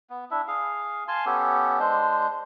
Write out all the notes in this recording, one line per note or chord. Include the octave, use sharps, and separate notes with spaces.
B3
D4 E4 E5
G#4 F5
F5 G#5 A5 C6
B3 C#4 G4 A4
G#3 D4 C5